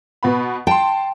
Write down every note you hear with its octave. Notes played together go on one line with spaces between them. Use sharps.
B2 B3 B5
G5 A5 C6